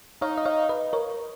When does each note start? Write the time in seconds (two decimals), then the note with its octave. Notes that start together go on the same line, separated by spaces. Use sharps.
0.21 D#4 C#5 F5
0.38 D#5
0.46 C#5 F5
0.69 B4 D#5
0.93 A#4 C#5